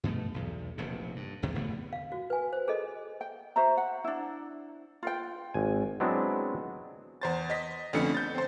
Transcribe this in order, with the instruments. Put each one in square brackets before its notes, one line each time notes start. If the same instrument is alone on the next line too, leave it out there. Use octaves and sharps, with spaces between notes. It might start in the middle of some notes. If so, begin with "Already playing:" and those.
[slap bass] G2 B2 F3 A3
B1 E2
F1 A#1 C3
G2
F1 E2 C3 D#3
F1 A2 D3 B3
[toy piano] F5
F#4
B4 G#5
C5
G#4 A4 D#5
[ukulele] G5
F#4 C5 E5 A#5
F#5
D4 E4
F4 B4 G5
[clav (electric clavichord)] G#1 G#5
F#3 G#3 B3 C4 D4 E4
[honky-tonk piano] E2 C5 A6
D#5 B6
F2 D3 A3 B3 C#4 C#7
G6 A6
C4 C5